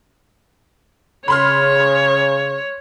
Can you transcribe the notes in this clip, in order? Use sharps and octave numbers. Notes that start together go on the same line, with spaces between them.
C#3 C#5 B5 C6 F6